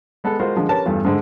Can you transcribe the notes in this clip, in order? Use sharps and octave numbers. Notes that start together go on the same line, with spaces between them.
G#3 B3 A4
G#3 F4 F#4 A#4 C5
D3 F3 G#3
C#4 G4 A#4 B4 A5
E2 G2 A3 F4
G#2 D3 G#3